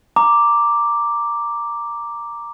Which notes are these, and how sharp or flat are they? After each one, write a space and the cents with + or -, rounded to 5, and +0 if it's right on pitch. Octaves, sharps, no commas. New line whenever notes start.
A#5 +0 D6 +0